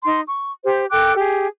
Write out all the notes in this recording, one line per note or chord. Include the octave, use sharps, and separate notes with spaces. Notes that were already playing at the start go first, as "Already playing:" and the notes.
D#4 C6
C#6
G4 C5
A4 G5 D6 F#6
G4 G#4